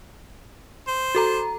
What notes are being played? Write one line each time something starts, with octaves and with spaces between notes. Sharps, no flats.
C5
F#4 A4 A#5